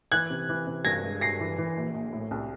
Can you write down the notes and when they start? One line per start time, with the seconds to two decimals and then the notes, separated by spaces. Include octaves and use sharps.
0.12 E3 F#6 G#6
0.30 C3
0.49 E3
0.67 C3
0.85 G2 G#6 A#6
1.03 G#3
1.21 G2 A#6 C7
1.41 E3
1.58 E3
1.77 A#1
1.94 A#1
2.13 A2
2.31 C2